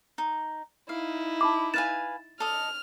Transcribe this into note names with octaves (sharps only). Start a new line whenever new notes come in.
D#4
D#4 E4 F5
A5 B5 D6
B4 F5 G#5 A6 E7
A4 D#5 F6